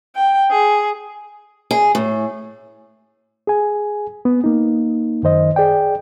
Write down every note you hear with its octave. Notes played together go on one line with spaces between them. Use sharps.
G5
G#4
G#4
A2
G#4 G#5
B3
A#3 D#4
F#2 D#3 C5 D#5
G#4 D5 G5